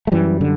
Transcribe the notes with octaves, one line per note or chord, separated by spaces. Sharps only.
A3
F#2 E3 G3
D3